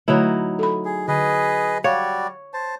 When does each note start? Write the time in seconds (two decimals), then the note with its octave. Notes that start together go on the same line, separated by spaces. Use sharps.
0.08 D3 F#3 A3 D#4 E4 B5
0.59 A4 B5
0.85 G#4
1.08 D3 G#4 B4 D#5
1.84 G3 F#4 C#5 D5 F5
2.54 C5 A5